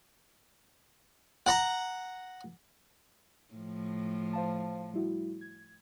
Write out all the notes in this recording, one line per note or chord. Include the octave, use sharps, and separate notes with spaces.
F#5 A#5
A2 F3
C5 F5 A5
G3 E4 F#4
G#6